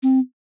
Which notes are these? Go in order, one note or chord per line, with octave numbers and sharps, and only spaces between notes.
C4